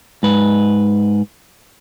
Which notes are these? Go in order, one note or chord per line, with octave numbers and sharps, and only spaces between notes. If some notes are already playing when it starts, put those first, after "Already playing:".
G#2 B4